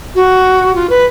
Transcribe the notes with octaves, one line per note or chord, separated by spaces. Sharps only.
F#4
F4
B4